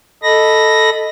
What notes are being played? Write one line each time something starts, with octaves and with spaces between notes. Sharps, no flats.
A4 D#5 B5 A#6